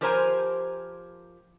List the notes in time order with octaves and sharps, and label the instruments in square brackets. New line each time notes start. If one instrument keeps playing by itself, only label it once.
[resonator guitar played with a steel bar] F3 G4 A#4 C5 G#5 A#5